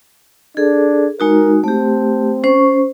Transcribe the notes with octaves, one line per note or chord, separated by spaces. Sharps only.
D4 G#4 A4
G#3 D#4 F#4 A#4
A3 C4 G4
C#4 C5 C#6